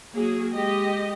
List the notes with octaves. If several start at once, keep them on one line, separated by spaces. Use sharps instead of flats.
F#3 A#3 G#4
G#3 G4 D#5